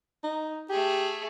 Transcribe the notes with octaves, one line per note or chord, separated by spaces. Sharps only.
D#4
A3 G4 G#4